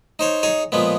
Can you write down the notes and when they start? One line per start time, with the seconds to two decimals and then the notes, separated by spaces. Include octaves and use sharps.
0.19 D#4 C5 C#5
0.43 D#4 G#4 C#5
0.72 A#2 F3 G#3 B3